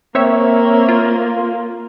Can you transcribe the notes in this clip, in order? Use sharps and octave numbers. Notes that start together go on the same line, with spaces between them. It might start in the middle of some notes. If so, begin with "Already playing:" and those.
A#3 C4 C#5 E5
F4